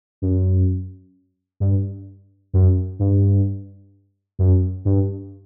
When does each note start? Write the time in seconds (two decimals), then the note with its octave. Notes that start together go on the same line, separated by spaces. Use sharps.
0.22 F#2
1.60 G2
2.54 F#2
2.99 G2
4.39 F#2
4.85 G2